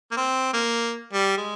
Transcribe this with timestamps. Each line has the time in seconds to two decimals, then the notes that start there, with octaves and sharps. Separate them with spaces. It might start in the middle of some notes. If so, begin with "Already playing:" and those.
0.11 A#3
0.17 C4
0.53 A#3
1.13 G3
1.37 G#3